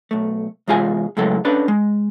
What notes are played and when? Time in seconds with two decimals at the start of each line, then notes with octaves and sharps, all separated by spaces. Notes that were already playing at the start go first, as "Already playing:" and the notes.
0.11 B1 A3
0.67 E2 C3 G#3 F4 G#4 G#5
1.17 A2 C#3 F#3 G#3 A4
1.45 C#4 D4 A4 B4
1.68 G#3